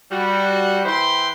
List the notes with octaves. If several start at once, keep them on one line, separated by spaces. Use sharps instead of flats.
G3 F#4
E3 B4 C5 E5 G5 C6